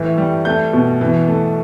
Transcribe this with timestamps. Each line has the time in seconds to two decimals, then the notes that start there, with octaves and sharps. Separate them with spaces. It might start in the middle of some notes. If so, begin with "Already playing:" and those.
Already playing: A2 E3
0.18 G3
0.45 A3 G6
0.73 B2
1.01 E3
1.28 A3